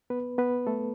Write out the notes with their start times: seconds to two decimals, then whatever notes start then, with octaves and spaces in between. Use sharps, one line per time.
0.10 B3 B4
0.38 B3 B4
0.67 A3 A4